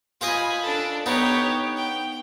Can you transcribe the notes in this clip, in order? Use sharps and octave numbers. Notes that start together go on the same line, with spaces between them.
F4 C5 D#5 G#5 B5
D4 A4
B3 D#4 G4 C#5
G5